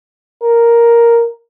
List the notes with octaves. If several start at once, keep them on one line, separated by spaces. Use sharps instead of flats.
A#4